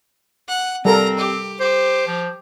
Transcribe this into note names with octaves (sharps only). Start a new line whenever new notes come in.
F#5
G3 C4 A4 A#4 A#5
G4
G4 C5
F3